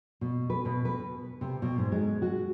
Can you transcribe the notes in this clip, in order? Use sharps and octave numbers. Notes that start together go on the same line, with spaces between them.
B2
B4
B2
B4
C3
B2
G#2
G#3
F#4